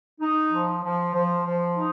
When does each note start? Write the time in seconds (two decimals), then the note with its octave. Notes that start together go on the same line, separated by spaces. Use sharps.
0.20 D#4
0.51 F3
0.83 F3
1.14 F3
1.45 F3
1.77 D#4